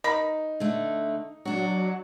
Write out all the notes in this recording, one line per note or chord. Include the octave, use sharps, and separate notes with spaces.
D#4 A#4 B5
D3 A3
F#3 D4 F#4